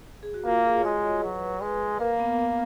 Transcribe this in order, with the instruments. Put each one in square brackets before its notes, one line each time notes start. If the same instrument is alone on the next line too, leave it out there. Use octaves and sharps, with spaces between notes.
[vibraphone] G#4
F#4
[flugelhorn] A#3 [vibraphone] F4
[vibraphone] G#4
C#5
[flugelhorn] G#3 [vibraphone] D#5
[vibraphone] C#5
[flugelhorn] F#3 [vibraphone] B4
[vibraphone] B4
[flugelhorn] G#3 [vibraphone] B4
[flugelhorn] A#3 [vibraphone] A#4
[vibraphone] B3
B3